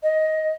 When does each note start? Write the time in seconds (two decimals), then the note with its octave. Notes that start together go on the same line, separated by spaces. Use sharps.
0.02 D#5